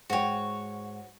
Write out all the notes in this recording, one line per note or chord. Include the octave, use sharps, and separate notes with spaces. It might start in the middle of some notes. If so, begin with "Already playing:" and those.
G#2 F#4 C#5 G5